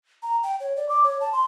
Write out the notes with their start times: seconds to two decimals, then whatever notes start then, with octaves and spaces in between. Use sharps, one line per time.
0.22 A#5
0.43 G5
0.60 C#5
0.76 D5
0.89 D6
1.04 C#5
1.20 A5
1.33 C6